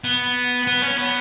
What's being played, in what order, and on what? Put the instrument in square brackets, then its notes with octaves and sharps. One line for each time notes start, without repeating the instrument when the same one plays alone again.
[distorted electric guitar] B3
B3
C#4
B3